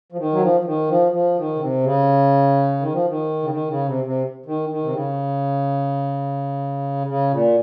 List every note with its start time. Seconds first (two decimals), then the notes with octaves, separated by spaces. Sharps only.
0.12 F3
0.18 D#3
0.32 F#3
0.41 F3
0.60 F3
0.64 D#3
0.89 F3
1.12 F3
1.37 D#3
1.55 C#3
1.60 C3
1.84 C#3
2.79 D#3
2.92 F3
3.07 D#3
3.43 C#3
3.50 D#3
3.68 C#3
3.86 C3
4.04 C3
4.46 D#3
4.69 D#3
4.83 C3
4.93 C#3
7.07 C#3
7.31 A#2